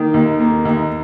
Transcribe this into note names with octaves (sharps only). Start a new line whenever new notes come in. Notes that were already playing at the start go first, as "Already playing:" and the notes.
Already playing: D#3 A#3
D#2
A#3
D#2